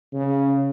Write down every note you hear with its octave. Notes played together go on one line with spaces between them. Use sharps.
C#3